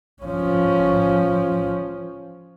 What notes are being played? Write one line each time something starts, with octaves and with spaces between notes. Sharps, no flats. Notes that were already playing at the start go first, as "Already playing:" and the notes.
F3 C#4